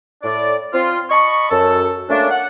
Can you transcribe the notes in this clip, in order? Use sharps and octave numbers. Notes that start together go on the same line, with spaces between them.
A2 D5
C4 F4
D#5 A5 B5 C#6
F#2 A4
A3 A#3 C#4 D4
F#5